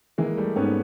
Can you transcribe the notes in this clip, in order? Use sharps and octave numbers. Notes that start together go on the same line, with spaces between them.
E3 G#3 A#3
G3 A3
G#2 B3 C#4